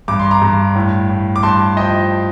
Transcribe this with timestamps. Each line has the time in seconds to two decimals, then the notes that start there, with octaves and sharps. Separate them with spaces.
0.08 G2 D6
0.19 C6
0.31 A#5 D6
0.42 G2
0.75 A2
1.09 A2
1.36 D6
1.43 G2 A5 C6
1.77 F3 D#5 G5